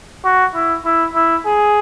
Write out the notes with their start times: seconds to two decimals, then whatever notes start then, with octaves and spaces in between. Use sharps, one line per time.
0.24 F#4
0.55 E4
0.85 E4
1.15 E4
1.46 G#4